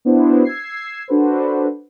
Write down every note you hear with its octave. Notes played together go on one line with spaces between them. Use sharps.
B3 D4 E4 F#4 C5
E6 G#6 C7
D4 F#4 A4 B4 C5